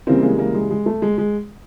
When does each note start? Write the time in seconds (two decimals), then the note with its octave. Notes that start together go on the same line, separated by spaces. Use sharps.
0.07 C#3 E3 G3 A#3 C4
0.22 G#3 A#3
0.38 G#3 A#3
0.54 G#3
0.70 G#3
0.86 A3
1.02 G#3
1.18 G#3